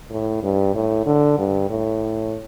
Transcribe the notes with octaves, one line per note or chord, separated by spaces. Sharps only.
A2
G2
A2
D3
G2
A2